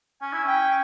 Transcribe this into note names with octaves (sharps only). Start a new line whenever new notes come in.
C#4 G#5
E4
C#4 G5